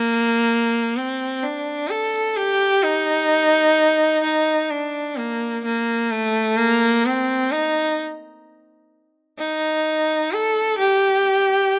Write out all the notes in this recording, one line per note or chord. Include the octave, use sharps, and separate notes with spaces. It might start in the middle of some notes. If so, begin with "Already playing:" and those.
Already playing: A#3
C4
D4
A4
G4
D#4
D#4
D4
A#3
A#3
A3
A#3
C4
D#4
D#4
A4
G4